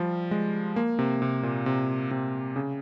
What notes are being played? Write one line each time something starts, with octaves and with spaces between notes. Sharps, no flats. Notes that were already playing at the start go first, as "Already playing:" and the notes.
Already playing: F3 G3
G#3
A#3
C3
C3
A#2
C3
C3
C#3